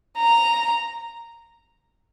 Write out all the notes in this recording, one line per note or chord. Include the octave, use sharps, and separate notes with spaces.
A#5